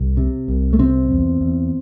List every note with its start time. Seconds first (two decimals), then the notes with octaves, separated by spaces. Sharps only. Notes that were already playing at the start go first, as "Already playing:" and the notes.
Already playing: C2
0.17 C3
0.48 C2
0.73 A3
0.79 C3 C4
1.11 E2
1.41 E2